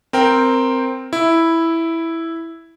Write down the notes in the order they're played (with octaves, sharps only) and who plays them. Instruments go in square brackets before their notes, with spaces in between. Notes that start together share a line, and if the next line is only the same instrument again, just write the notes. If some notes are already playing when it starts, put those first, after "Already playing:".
[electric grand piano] C4 A#4 G5
E4